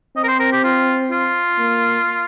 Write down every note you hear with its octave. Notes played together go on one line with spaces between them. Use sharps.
C4 D#5
A#4
C5
A#4
G4
F4
F4
A#3